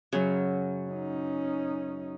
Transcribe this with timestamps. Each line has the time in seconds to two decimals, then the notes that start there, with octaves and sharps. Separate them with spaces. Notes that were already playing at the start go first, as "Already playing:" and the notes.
0.13 F#2 C#3 F#3 F#4
0.89 C#4 D#4